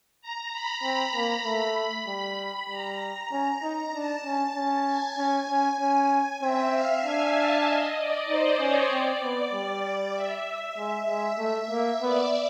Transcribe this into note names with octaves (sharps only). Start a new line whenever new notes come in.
A#5
B5
C4 B5
A#3 B5
A3
G3
G3 A#5
C#4
D#4
D4 A5
C#4
C#4 A5
G#5
C#4
C#4
C#4
C4 E5
F5
D4 G#5
A5
D#5
D5
D#4 C5
C#4 C#5
C4 D5
B3
G3
E5
G#3
G#3
A3
A#3
B3 D5